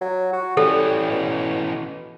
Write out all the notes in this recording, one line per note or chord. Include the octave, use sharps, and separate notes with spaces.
F#3
F#4
E3 G3 C#4 A4
B2